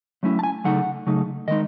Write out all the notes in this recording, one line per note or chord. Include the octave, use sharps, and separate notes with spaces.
F#3 A3 C#4 E4
A5
G#5
C#3 F#3 A3 D#4 F#5
C#3 F#3 A3 D#4
D#3 G#3 D#4 D#5